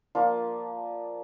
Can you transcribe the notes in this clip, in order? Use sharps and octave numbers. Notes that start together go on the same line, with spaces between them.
F3 A#3 D4 F4